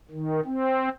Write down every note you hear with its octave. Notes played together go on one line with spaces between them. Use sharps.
D#3
C4